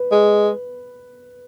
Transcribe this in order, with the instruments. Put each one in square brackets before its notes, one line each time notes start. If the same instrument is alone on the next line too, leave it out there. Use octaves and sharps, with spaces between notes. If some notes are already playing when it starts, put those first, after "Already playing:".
Already playing: [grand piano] B4
[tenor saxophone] G#3